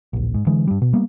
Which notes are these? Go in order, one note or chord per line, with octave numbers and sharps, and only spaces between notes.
D1 A#1
G#2
D3 E3 G#3
G2 G3
B2
G3 A#3 B3